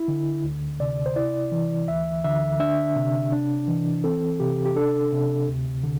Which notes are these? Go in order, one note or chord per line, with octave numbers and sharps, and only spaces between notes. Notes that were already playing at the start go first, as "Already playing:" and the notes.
Already playing: E4
D3
D2
C3 D5
C5
E4 D5
E3
D2 E5
D3 E5
D4 E5
C3
D4
E3
C4 A4
C3 G4
G4
D4 A4
C3
D2
D3